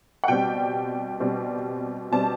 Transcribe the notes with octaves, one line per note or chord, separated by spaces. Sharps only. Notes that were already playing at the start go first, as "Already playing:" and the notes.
F#5
B2 G3 C4 G5
B2 G3 C4
B2 G3 C4 A5